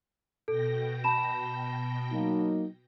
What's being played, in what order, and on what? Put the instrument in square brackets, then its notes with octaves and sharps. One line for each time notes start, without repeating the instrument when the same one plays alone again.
[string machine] B2 G5 A#6 [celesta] A4
[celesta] A5 B5 E7
[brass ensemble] F#3 A#3 D#4